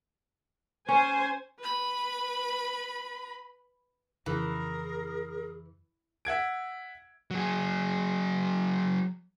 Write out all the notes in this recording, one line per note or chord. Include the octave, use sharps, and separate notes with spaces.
C#4 C5 G#5
B4 B5
F2 C#3 E3 G#4 A#4
E5 F#5 G#6 D7
F#3 G#4